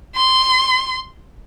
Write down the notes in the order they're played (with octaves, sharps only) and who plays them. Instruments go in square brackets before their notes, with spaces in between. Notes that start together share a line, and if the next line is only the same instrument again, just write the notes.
[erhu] C6